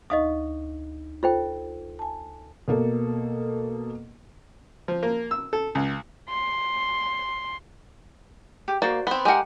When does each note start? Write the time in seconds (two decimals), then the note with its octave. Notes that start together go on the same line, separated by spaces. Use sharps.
0.10 D2 D#4 D#5 F5 C#6 D#6
1.23 F4 A4 C5 G5
1.99 G#5 A5
2.68 B2 A#3 A4
4.88 F3
5.03 A#3
5.31 E6
5.53 A4
5.75 C#2
6.29 C6
8.68 G4
8.82 A#3 F#4 C5 D5
9.07 B3 C4 B5
9.25 G#3 G4 A#4 F#5